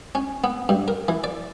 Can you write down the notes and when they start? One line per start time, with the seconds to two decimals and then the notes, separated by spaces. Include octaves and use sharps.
0.15 C#4
0.44 B3
0.69 G2
0.88 A#4
1.08 E3
1.24 D5